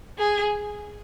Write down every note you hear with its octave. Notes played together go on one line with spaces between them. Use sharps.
G#4